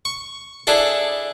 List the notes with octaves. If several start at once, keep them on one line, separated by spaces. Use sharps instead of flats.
C#6
D4 E4 G#4 A4